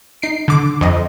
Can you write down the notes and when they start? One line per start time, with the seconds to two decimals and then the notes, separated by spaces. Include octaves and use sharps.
0.22 D#4 C7 D7
0.48 D3 D6
0.81 F2 D#5